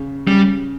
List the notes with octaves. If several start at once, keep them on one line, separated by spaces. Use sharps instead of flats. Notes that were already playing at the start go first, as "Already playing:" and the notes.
Already playing: C#3
C#3 G3